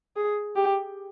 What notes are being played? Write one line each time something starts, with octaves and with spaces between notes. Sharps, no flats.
G#4
G4